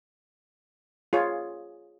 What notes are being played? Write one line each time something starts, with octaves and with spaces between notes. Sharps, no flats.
F4 G#4 C#5